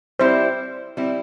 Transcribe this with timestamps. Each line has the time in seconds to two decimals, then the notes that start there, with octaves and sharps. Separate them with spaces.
0.19 G3 C4 E4 C5
0.97 G3 C4 E4